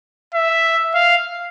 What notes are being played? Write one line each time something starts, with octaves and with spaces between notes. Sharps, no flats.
E5
F5